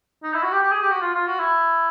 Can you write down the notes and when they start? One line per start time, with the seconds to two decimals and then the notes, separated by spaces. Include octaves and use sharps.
0.23 D#4
0.33 E4
0.43 F#4
0.52 G4
0.62 G4
0.72 G#4
0.82 G4
0.91 F#4
1.01 F4
1.14 F4
1.27 F#4
1.39 E4